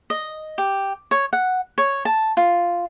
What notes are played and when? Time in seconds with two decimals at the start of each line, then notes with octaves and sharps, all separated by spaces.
0.10 D#5
0.58 G4
1.11 C#5
1.33 F#5
1.78 C#5
2.05 A5
2.37 F4